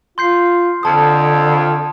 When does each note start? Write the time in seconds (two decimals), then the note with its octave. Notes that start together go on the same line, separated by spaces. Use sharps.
0.18 F4 C6 G6 C7
0.83 F2 D3 A5 D#6